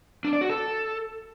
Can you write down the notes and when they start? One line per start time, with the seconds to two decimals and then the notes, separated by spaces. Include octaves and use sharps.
0.25 D4
0.33 D5
0.41 F#4
0.49 A4